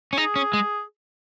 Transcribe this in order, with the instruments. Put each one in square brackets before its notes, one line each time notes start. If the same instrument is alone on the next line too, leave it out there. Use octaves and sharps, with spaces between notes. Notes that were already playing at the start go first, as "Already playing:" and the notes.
[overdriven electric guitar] C#4
[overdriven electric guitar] D#4 [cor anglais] G#4
[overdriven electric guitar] C#4
G#3